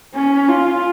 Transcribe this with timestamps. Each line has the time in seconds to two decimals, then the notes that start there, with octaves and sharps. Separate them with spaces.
0.14 C#4
0.49 F4